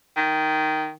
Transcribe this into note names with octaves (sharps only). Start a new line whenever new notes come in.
D#3